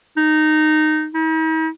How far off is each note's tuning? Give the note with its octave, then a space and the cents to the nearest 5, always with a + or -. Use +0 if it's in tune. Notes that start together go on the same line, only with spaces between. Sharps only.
D#4 -15
D#4 +45